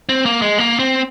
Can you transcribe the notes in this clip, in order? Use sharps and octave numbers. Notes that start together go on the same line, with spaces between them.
C4
A#3
G#3
A#3
C4